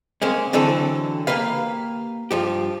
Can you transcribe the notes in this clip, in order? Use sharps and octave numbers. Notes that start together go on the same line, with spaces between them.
G#3 A#3 C4 C#4
D3 E3 F#3 C4 A4
A#3 G4 B4 F5
G2 F3 G4